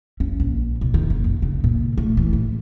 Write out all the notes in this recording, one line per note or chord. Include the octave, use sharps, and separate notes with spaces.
C#4
A#1
B2
D#3
F#1
A#2
C#3
A#2
A3
E3
A1